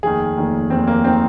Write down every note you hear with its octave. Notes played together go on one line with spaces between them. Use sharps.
F1 D#2 D#3 G#4
F1 D#2 D#3
F1 D#2 D#3 C4
A#3
D#3 C4